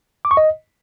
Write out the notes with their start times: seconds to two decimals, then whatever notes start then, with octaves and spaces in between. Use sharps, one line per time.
0.25 D6
0.31 C#6
0.37 D#5